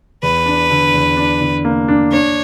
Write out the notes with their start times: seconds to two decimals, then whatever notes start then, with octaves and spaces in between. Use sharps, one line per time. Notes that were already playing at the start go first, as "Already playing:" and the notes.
0.22 E2 B4
0.46 D4
0.70 D3
0.94 E2
1.17 D4
1.41 D3
1.65 A#3
1.88 D4
2.12 D4 C#5